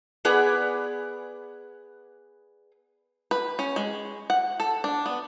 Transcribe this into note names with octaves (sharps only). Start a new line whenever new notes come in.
B3 G#4 B4 D5
B4
C#4
G#3
F#5
A4
D4
B3